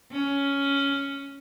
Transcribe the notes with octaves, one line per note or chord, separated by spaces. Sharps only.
C#4